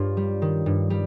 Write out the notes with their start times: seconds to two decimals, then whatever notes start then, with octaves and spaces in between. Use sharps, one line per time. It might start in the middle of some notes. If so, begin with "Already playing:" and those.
Already playing: G2 F4 G4 C#5
0.17 G3
0.42 D#3
0.66 G2
0.90 G3